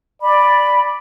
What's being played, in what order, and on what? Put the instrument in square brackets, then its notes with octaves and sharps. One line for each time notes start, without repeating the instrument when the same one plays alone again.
[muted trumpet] D5 [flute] B5